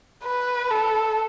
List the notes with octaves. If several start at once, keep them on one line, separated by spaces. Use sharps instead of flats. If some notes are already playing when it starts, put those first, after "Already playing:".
B4
A4